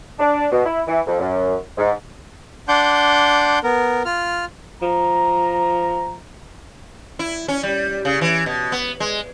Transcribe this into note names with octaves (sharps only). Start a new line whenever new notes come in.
D4
B2
E4
E3
F2
F#2
G#2
D4 F#5 C6 D6 G6
B3 A#4
F4 F6
F3 A#5
E4
C#4
G3
C#3
E3
B2
B3
G#3